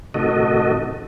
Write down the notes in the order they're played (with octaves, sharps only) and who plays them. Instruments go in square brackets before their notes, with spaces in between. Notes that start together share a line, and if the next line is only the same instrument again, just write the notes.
[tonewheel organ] A2 C3 D#3 F#4 A4 D#5